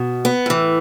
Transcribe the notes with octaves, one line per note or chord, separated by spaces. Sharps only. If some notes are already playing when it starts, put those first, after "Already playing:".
Already playing: B2
B3
A2 E3